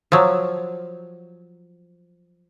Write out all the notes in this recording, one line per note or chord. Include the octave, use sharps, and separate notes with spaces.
F3 F#3